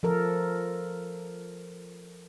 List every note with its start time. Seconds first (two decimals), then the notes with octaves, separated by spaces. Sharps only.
0.03 F3 A4 A#4